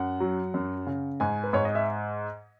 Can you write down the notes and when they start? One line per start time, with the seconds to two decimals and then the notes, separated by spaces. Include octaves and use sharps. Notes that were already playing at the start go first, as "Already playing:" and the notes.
Already playing: F#2 F#5
0.20 F#3
0.54 F#2
0.87 C#3
1.20 G#2 G#5
1.44 B4
1.53 G#2 C#5
1.65 D#5
1.75 E5